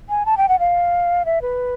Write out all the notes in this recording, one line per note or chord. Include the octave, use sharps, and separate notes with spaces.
G#5
A5
G5
F#5
F5
E5
B4